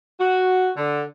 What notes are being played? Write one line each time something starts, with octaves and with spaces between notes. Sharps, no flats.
F#4
D3